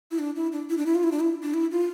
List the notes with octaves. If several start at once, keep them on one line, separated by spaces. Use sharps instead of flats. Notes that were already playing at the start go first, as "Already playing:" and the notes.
E4
D4
E4
D4
E4
D4
E4
F4
E4
D4
E4
D4
E4
F4